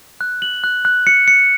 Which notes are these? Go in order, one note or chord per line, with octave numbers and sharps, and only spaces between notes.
F#6
F#7
F#6
F#6
C#7
C#7